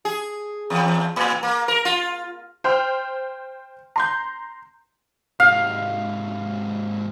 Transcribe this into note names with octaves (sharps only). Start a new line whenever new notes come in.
G#4
E2
A2
A#3
A#4
F4
C5 G5 C6 F6
A#5 C6 G6
G#2 C3 F5